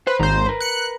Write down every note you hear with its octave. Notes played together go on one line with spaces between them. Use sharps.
B4 C5
G#1 D#2 C5 A#5
A#4 B4
F#6 C#7